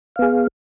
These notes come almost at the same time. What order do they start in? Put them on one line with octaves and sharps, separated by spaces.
F5 B3 G#4